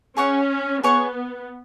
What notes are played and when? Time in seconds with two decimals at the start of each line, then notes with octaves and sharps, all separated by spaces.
0.17 C#4 G#4 C#5 F#5 C#6
0.83 B3 G#4 C#5 F#5 C#6